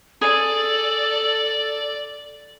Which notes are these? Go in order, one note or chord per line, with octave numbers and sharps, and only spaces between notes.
G#4 A4 D5